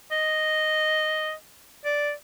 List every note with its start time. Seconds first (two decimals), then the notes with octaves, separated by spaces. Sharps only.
0.11 D#5
1.85 D5